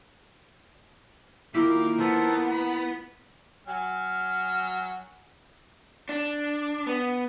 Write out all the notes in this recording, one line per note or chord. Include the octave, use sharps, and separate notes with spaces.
D#3 A#3 E4 F4 G4 A#4
B3 A4 C5
B5
F#3 G#5 F6
D4
B3